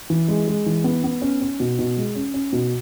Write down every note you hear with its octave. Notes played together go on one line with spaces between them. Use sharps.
E3
G#3
G#3
E3
B3
B3
C#4
C#4
B2
B2
G#3
C#4
C#4
B2